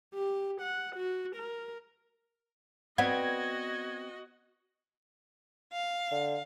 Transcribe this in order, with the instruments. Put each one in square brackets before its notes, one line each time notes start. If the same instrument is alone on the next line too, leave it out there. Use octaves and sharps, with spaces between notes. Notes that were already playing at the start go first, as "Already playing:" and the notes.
[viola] G4
F#5
F#4
A#4
[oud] B3 C4 [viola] F#4 D#5 [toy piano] D5 F#5 [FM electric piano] G#6
[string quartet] F5
[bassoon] D3